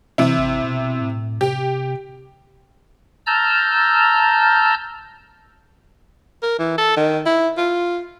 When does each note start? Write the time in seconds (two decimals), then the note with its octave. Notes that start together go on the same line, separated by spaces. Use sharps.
0.18 C3 E3 E4
0.38 G#1
0.64 B2
1.01 A2
1.41 C3 G4
3.27 A5 A#5 E6 F6 G6
6.43 A#4
6.59 E3
6.78 A4
6.97 D#3
7.26 E4
7.58 F4